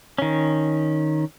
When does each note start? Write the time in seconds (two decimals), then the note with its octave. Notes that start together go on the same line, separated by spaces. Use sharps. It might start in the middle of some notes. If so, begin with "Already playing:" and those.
0.18 D#3 C#4